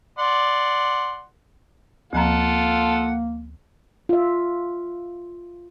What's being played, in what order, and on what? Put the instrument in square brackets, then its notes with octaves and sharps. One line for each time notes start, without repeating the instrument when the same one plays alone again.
[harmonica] D5 F#5 C6
[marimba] D2 F3 A#5 [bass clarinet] A#3 [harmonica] F4 A4 F#5
[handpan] F4 E5